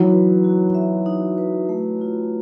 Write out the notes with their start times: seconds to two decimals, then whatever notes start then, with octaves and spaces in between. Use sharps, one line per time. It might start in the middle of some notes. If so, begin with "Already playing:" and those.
Already playing: E3 F#3 D#4
0.12 B4
0.44 F#4
0.75 E5
1.06 D#4
1.38 B4
1.69 A3
2.01 F4